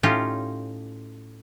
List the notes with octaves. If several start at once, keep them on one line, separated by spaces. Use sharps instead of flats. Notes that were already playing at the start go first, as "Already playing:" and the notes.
A2 C#4 D#4 F4 G4